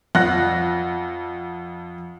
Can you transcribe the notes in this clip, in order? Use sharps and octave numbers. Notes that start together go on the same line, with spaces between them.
F2 F#5 F#6 A#6